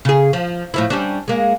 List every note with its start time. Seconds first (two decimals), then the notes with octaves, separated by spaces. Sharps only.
0.05 C#3 G#4
0.33 F3
0.74 A2 F3 E4
0.90 G3 C#4 D4
1.28 G#3 A#3